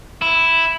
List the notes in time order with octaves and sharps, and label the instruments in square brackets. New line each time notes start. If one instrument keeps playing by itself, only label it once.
[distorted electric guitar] E4